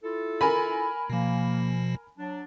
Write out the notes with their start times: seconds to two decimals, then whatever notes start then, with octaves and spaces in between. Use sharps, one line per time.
0.03 E4 F4 A4
0.41 A#4 G#5 B5
1.10 B2 F3 A#3
2.18 F#3 D4